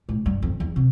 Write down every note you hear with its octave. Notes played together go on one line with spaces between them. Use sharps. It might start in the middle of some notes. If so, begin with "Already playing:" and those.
A2
G2
F2
E2
C3